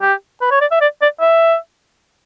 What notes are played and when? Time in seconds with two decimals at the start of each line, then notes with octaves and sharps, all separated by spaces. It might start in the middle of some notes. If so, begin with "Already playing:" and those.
0.01 G4
0.41 B4
0.51 C#5
0.61 D5
0.72 E5
0.81 D5
1.02 D5
1.20 E5